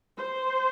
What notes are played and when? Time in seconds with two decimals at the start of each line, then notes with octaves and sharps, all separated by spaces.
0.18 C5